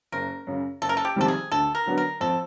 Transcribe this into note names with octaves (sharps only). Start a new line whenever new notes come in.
F#1 A#4
F#2 C#3
F#1 A4
A#4
A4
G4
F2 C3 D#3 G3 A4
G#4
D2 A4
A#4
D3 F#3 B3 D4
A#4
F2 A4